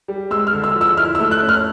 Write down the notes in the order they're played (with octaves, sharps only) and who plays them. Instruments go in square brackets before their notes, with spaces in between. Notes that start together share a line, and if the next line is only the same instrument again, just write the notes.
[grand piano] G3
[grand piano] G#3 [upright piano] E6
[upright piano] F6
[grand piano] D3
[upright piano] E6
[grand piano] F3
[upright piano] E6
[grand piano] E4 [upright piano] F6
[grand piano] A3 [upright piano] E6
[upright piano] F#6
[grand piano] C#4
[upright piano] F6